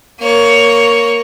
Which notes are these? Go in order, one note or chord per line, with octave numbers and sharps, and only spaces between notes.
A#3 C#5